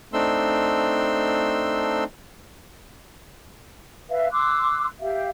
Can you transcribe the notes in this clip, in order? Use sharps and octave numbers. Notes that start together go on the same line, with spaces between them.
A3 C4 D4 D#4 C6 E6
B4 E5 F5
C6 D6 E6 F#6
G4 E5 F5